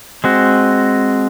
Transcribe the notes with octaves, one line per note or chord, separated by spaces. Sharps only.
G#3 C4 F#4